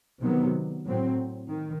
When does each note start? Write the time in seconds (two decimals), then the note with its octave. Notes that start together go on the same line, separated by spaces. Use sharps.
0.21 C3 D#3 F#3 B3
0.84 A2 F#3 C4
1.49 D#3